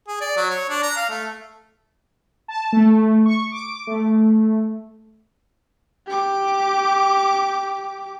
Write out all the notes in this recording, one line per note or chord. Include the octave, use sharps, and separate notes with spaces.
G#4
D5
F#3
C#5
D4
A#5
F5
A3
A5
A3
C#6
D6
A3
G4 D6